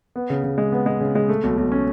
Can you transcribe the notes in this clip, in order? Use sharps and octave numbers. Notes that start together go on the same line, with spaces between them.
B3
C#3
C#3
G#3
B3
G#3
C#3
G#3
A3
B1
B1
C#4